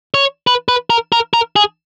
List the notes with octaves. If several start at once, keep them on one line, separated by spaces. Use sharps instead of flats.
C#5
B4
B4
A#4
A#4
A#4
G#4